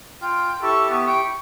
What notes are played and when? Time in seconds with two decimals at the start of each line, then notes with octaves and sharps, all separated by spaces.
0.21 F4 G5
0.62 E4 G4 A4 C#6
0.89 B3
1.06 G5 C#6